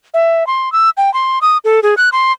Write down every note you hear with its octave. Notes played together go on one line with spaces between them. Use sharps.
E5
C6
E6
G5
C6
D#6
A4
G#4
F#6
C6